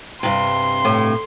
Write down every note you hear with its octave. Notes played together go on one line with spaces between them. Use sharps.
G2 C3 C6
A2